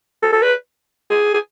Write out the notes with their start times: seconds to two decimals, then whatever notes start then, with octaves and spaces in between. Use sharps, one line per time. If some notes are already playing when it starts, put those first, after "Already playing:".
0.22 A4
0.33 A4
0.42 B4
1.10 G#4
1.34 G#4